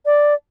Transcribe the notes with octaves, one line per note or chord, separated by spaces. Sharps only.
D5